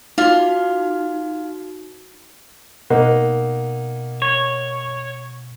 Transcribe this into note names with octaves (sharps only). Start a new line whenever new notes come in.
D#4 F4 F#4
B2 A#3 D#4 F#5
C#5